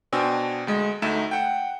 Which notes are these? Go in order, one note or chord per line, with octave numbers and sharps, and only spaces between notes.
B2 D4 C5 G5 G#5 E6
D2 G#3 D#5
D2 A3 D#4 E5 E7
F#5 G5